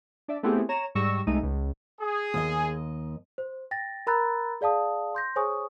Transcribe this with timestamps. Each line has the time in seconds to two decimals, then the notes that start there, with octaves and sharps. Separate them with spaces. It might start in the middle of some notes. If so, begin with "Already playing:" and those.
0.28 D4 D5 E5
0.43 A3 B3 C4 E4 G4 G#4
0.69 C#5 A#5 E7
0.95 G#2 G3 C#6 E6 A#6 E7
1.27 C2 G#3 A3 D#4 D#7
1.43 C#2
2.01 G#4
2.34 D#2 D#5
3.38 C5
3.71 G5 A6 A#6
4.07 A#4 A#5 B5 E6 F#6 A6
4.61 G#4 D5 F5 A5 D#6
5.15 C6 G6 A#6
5.36 G#4 C5 C#5 G#5 C#6 D#6